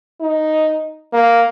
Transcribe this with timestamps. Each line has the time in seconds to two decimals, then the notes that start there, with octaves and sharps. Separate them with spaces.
0.21 D#4
1.12 A#3